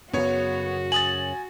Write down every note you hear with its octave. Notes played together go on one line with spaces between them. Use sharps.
F#2 C#3 B3 F#4 C#5
G#5 D#6 A6 F#7